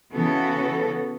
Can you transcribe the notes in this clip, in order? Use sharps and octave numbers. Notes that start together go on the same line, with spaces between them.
C#3 E3 B3 F#4 A4